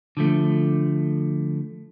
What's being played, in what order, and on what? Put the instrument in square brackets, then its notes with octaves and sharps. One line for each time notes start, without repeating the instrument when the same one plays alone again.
[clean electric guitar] D3 F3 A3